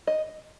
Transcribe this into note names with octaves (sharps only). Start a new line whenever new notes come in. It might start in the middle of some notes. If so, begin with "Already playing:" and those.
D#5